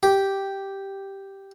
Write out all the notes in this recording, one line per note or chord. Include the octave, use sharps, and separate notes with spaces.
G4